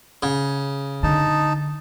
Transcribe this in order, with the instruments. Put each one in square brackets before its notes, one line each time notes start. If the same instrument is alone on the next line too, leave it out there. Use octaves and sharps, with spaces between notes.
[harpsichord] C#3
[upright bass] D3 [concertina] D#4 A5